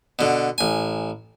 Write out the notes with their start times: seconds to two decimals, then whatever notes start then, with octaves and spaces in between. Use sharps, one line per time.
0.19 B2 D3
0.58 A1 G#5